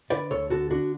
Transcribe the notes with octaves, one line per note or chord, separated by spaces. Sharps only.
D3 B4 D5
D2 A4 C#5
D3 F#4 A4
D3 D4 F#4